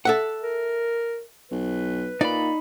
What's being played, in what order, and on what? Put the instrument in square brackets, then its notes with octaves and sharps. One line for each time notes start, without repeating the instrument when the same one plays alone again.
[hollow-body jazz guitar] A4 E5 F#5
[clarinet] A#4
[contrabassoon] B1 [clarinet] B4
[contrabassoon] A#2 [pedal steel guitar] D#4 B5 [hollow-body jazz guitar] D5